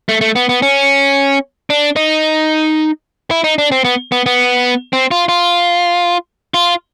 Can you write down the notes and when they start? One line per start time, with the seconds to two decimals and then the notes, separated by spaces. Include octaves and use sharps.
0.09 A3
0.21 A3
0.36 B3
0.49 B3
0.62 C#4
1.70 D4
1.96 D#4
3.31 E4
3.44 D#4
3.58 D4
3.72 C4
3.84 B3
4.12 B3
4.26 B3
4.93 C4
5.11 F4
5.29 F4
6.54 F4